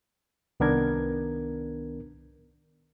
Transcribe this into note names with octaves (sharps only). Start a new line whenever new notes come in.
C2 D#3 B3 D4 A#4 G#6